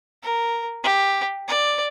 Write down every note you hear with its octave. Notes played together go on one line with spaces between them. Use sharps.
A#4
G4
D5